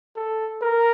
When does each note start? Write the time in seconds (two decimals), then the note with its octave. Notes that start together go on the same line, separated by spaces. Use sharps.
0.16 A4
0.62 A#4